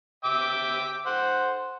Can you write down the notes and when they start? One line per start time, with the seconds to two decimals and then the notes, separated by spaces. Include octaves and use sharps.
0.24 E5 G5 D6
1.06 C5 F#5